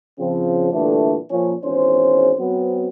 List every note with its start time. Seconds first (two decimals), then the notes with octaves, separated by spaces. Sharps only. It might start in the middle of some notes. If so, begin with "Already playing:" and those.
0.18 C#3 F3 C4
0.71 A#2 D3 E3 G3 A3 D4
1.30 A#2 F3 C#4
1.63 G#1 E2 C#4 C5
2.38 F#3 B3 C4